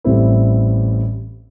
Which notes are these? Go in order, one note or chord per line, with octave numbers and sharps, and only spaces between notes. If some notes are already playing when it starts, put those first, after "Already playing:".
A1 A2 G3 C4 E4